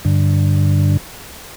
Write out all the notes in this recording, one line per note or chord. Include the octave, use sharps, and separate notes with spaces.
G2 D3